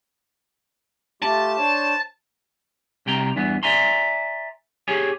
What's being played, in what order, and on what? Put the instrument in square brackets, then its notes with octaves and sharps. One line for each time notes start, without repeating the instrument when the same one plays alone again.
[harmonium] A3 F4 G4 [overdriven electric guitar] A5
[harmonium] D4 C5 C#5
[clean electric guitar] C2 C3 G5 A#5
E2 G2 E3 B3
D5 E5 G#5 A#5 C6
G4 G#4 C#5 G#5